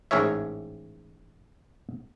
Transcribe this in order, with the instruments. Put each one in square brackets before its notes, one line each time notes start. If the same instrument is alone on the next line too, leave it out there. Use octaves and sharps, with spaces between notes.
[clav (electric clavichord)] A1 G#2 G#4 A#4 C#5 E5